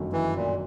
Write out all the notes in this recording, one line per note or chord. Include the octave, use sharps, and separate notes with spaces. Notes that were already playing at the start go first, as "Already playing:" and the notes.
Already playing: G1 F#2 D#3 F#3 A3
E3
A#2